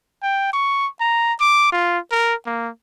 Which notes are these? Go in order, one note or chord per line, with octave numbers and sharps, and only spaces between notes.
G5
C#6
A#5
D6
F4
A#4
A#3